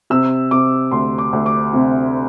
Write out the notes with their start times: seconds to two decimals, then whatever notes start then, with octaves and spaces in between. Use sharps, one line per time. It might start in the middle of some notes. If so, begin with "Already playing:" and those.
0.10 C3 E6
0.51 C3 D6
0.91 D2 C6
1.18 D6
1.33 D2
1.46 D6
1.73 C3